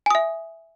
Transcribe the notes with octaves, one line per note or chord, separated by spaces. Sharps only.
E5 G#5 D#6